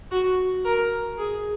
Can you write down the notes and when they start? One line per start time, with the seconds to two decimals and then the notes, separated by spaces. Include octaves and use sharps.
0.11 F#4
0.64 A#4
1.18 G#4